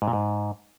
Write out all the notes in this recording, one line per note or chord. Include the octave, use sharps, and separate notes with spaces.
G#2
A#2
G#2